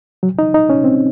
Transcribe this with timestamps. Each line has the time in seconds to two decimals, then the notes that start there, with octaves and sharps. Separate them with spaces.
0.23 F#3
0.39 D#4
0.54 D#4
0.70 C#4
0.84 C4